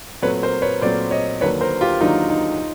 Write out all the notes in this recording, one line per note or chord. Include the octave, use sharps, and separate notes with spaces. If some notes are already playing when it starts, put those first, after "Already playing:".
A#2 F#3 A3 C4 B4 C#5
A#4 C5
B4 C#5
A#2 F#3 A3 C4 C5 D5
C#5 D#5
D#2 D3 F#3 A#3 D4 B4 C#5
A#4 C5
F4 G4
D#2 D3 F#3 A#3 D4 D#4 F4
D#4